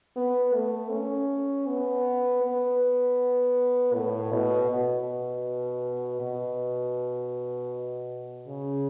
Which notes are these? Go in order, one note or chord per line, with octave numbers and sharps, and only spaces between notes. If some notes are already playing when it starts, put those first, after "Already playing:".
B3
A3
C#4
B3
B3
A2
B2
B2
B2
C#3